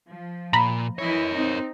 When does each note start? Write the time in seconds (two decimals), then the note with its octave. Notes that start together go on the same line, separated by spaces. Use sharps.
0.10 F3
0.53 A#2 A#5 B5
0.99 E3 E4 A#4 C#5 D#5
1.32 C4 D#4